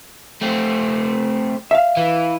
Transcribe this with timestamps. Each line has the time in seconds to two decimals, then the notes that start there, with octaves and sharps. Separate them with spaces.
0.41 A3 C4
1.71 E5 F5
1.97 E3